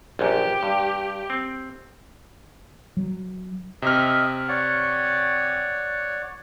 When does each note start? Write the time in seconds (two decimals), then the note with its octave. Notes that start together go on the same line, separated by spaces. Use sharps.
0.19 A#1 F#2 G4
0.63 G2
1.30 C4
2.97 F#3
3.82 C3 D#5 E5 F6
4.48 C#5 D5 F#5